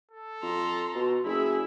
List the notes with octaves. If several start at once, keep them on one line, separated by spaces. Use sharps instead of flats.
A4
F2 A#5 C6
B2
F#1 E4 G#4 E5 B5